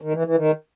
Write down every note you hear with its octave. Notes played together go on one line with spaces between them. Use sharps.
D#3
E3
E3
D#3